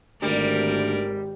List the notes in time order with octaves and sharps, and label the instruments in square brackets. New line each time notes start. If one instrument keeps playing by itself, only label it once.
[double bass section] G#1 [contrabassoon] D2 [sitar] G3 [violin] A#4 D5